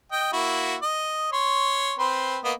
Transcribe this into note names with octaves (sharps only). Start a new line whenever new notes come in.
D#5 G5
A#3 E4 F#4
D#5
C#5 C6
C4 B4 C6
A#3 B3 D#5